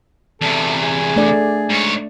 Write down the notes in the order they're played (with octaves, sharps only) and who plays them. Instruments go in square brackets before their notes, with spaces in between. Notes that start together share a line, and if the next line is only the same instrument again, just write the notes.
[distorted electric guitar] E2 C3 [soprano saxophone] A4
[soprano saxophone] G#4
[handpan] A3 D4 D5
[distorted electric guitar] G#2 C#5